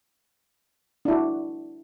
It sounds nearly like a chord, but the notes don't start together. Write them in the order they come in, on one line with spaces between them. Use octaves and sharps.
D4 E4 F#4